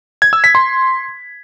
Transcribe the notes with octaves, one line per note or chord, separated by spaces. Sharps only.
G#6
E6
B6
C6